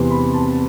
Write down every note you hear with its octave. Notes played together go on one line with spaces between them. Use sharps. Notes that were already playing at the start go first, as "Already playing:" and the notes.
Already playing: E2 C3 E3 C6
B5
A5